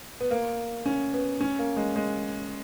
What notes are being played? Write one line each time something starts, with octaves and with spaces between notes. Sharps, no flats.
B3
A#3
C#4
B3
C#4
A#3
G#3
G#3